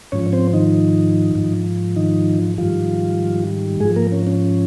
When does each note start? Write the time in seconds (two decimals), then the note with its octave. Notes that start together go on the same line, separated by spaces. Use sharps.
0.12 G#2 F3 C#4 C#5
0.33 C4 C5
0.53 D#3 D#4
1.35 G#2 F3
1.96 D#3 D#4
2.58 G#2 D#3 F3 G3 F4
3.80 G#2 F3 G#3 G#4
3.96 A#3 A#4
4.12 C#4
4.27 C#4